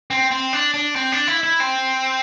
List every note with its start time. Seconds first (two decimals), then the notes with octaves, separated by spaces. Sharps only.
0.11 C4
0.31 C4
0.53 D4
0.74 D4
0.95 C4
1.12 D4
1.27 E4
1.43 E4
1.60 C4